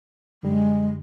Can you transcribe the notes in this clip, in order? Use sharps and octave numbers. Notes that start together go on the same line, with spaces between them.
F#2 D3 G3 G#3